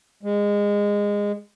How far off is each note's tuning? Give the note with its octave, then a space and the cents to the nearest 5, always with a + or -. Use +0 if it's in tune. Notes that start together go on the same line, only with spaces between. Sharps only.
G#3 -20